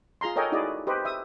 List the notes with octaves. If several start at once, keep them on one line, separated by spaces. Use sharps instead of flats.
F4 G#4 A#5 C6
A4 A#4 C#5 D#5 G5 G#5
D#4 E4 F#4 G#4 D5 D#5
G4 B4 C5 D#5
E5 D#6